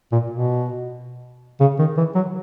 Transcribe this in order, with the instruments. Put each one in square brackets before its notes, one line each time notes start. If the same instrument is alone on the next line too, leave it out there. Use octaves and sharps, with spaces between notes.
[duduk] A#2
B2
C#3
D#3
E3
F#3